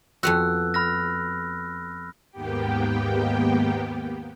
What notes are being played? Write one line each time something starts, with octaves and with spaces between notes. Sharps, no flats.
F2 B3 F#4 E6 F#6
B5 F6 A#6
D#2 G#2 A#3 B3 G4 G5